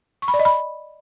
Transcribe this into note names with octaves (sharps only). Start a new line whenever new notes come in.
C#6
B5
D5
D#5
B5